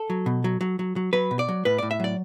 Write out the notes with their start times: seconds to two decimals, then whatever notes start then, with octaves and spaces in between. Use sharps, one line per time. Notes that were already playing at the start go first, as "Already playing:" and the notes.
Already playing: A4
0.10 F#3
0.26 B2
0.44 F#3
0.61 F#3
0.79 F#3
0.96 F#3
1.13 F#3 B4
1.31 B2
1.39 D5
1.48 F#3
1.65 A2 B4
1.78 A2 D5
1.91 E5
2.00 F#3 D5